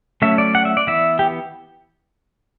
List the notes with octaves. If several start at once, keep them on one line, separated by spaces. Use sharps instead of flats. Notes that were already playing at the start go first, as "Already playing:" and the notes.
F#3 A3 C#4 E5
D5
F#5
E5
D5
E3 B3 E5
G4